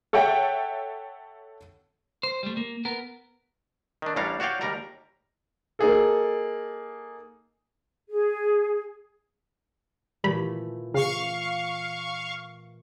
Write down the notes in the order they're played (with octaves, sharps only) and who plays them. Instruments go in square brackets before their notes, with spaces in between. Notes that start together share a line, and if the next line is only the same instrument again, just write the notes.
[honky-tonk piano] A4 C#5 E5 F#5 G5
[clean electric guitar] C5
G3 A3
A#3
B3 A#4
[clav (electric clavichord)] D#3 D4
A1 G3 D4 C#5 F5 A#5
F#4 C#5 D5 F5 G5
D#2 G3 A#4 A#5
[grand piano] A#3 D#4 G#4 A4
[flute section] G#4
[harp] A#2 E3 A3 [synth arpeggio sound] G3 B5
[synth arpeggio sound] C#3 [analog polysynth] F5 C#6